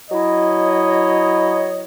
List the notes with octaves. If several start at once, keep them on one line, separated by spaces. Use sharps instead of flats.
F#3 E4 C#5 D#5